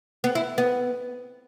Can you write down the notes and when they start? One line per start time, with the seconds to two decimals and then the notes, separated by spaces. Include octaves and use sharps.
0.24 B3
0.35 E4
0.58 B3